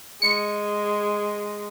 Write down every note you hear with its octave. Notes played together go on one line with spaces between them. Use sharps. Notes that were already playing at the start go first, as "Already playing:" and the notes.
G#3 C#7